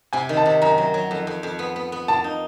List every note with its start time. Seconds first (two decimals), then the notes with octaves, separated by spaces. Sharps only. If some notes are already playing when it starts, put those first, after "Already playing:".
0.13 C3 G#5
0.29 D#3
0.37 A5
0.46 C3
0.62 F#2 A#5
0.78 F#3
0.94 F#3
1.11 F2
1.27 F2
1.43 F2
1.59 B3
1.76 B3
1.92 B3
2.08 A#3 A5
2.24 D#4